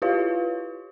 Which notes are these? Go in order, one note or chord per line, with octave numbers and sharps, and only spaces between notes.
E4 F4 G4 B4 C#5 F5